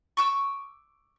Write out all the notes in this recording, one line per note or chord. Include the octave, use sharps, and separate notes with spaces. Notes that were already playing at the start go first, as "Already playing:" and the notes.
C#6 D6 E6